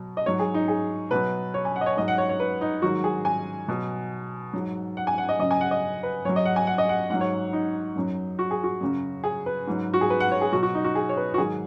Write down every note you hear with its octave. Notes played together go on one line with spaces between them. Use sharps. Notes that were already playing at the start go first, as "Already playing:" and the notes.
Already playing: B2 F#3
D#5
G#2 F#3 C#5
G#4
D#4
G#4
B2 F#3 B4
C#5
G#5
F#5
D#5
C#5
G#2 F#3 D#5
F#5
C#5
C#5
B4
D#4
G#2 D#3 F#3 F#4
G#4
G#5
B2 F#3
G#2 F#3
F#5
G#5
F#5
D#5
F#2 C#3 F#3 D#5
G#5
F#5
D#5
B4
F#2 F#3 C#5
D#5
F#5
G#5
F#5
D#5
F#5
G#2 F#3 F#5
C#5
D#4
F#2 F#3
F#4
G#4
F#4
F#2 C#3 F#3
G#4
B4
G#2 F#3
F#4
G#4
B4
F#5
C#5
G#4
B2 F#3 F#4
F#4
D#4
F#4
G#4
C#5
B4
F#4
G#2 D#3 F#3 G#4